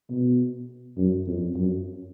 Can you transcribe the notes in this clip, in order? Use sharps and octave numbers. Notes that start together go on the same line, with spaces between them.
B2
F#2
F2
F#2